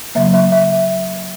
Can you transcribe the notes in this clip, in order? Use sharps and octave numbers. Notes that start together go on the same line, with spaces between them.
C#3 F#3 A#3 E5
E5
E5